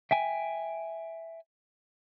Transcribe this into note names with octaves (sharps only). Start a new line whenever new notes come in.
E5 G5 G#5